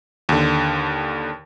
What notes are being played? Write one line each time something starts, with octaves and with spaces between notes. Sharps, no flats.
D#2 D3